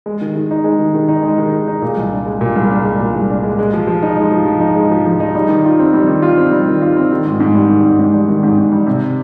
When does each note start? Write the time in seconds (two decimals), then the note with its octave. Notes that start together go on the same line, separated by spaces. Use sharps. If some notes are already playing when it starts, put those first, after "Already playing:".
0.06 G#3
0.21 D#3
0.36 D#3
0.51 D#4
0.64 G#3
0.79 D#3
0.95 D#3
1.08 D#4
1.23 G#3
1.38 D#3
1.52 D#3
1.68 D#4
1.82 A#2
1.97 C2
2.12 D4
2.26 G#3
2.41 A#2
2.56 C2
2.71 D4
2.85 G#3
3.00 A#2
3.14 C2
3.30 D4
3.43 G#3
3.59 G#3
3.73 F3
3.87 F3
4.03 D#4
4.17 G#3
4.32 F3
4.46 F3
4.61 D#4
4.76 G#3
4.91 F3
5.06 F3
5.20 D#4
5.34 G3
5.49 D#3
5.65 F4
5.79 C4
5.93 G3
6.08 D#3
6.22 F4
6.37 C4
6.52 G3
6.67 D#3
6.82 F4
6.97 C4
7.11 D#3
7.26 G#2
7.40 G#2
7.54 G3
7.69 D#3
7.84 G#2
7.99 G#2
8.13 G3
8.29 D#3
8.43 G#2
8.58 G#2
8.72 G3
8.86 C3